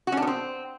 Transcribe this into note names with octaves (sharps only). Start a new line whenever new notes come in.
F#4
C#4
D4
B3
C4